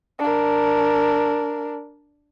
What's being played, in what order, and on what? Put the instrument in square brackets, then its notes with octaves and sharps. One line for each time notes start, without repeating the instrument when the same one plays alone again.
[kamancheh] D4 A#4